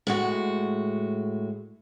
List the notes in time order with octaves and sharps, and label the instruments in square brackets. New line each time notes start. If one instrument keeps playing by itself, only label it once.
[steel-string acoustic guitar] A2 G#3 F#4